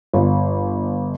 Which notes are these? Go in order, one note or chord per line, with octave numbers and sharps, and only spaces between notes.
G1